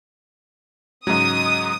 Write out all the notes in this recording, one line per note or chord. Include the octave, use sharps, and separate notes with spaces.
G#2 C#3 F#3 D#6